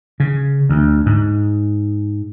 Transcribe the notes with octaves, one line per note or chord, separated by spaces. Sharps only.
C#3
D2
G#2